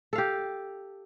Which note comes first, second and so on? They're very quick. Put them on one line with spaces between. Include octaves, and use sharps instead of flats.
A4 F5 G4